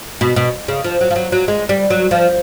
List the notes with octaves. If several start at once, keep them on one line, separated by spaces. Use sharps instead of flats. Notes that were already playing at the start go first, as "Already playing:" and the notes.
B2
B2
C#3
F3
F#3
F3
F#3
F#3
G#3
G3
F#3
F3